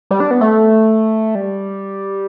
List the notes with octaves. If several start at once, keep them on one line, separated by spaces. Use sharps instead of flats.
G3
D4
B3
A3
G3